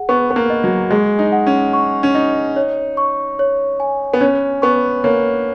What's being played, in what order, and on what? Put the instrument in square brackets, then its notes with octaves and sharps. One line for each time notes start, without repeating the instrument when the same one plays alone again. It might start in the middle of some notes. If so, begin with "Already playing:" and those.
Already playing: [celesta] G#4 F#5
[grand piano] B3 [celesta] C#6
[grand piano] B3
A#3
[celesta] D#5
[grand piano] F#3
[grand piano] G#3 [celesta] G#4
[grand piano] D#4
[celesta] F#5
[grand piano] C#4
[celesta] C#6
[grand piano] C#4
[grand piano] D#4 [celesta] D#5
[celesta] C#5
C#6
C#5
G#5
[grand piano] B3
[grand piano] C#4 [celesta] C#5
[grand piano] B3 [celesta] C#6
[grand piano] A#3 [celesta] C#5